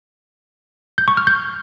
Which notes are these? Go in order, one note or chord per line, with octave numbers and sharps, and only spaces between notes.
G6
C#6
F6
G6